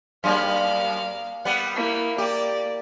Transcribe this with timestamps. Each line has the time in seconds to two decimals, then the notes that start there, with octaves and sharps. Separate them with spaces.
0.24 F#2 G3 A#3 F5
1.45 G3 B3 F#5
1.76 A#3 E4
2.18 A#3 G4 D5